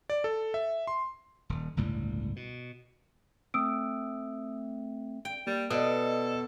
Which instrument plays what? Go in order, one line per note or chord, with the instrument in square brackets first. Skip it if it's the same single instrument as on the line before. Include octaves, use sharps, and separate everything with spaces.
[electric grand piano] D5
A4
E5
C6
[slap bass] D#1
G1 C#2 A2 G3
B2
[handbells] A3 C4 [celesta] D#6 E6 D7
[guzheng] G5
[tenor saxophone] G3 [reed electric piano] A#3
[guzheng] B2 [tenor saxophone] A4 [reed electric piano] D5 D#5 D#6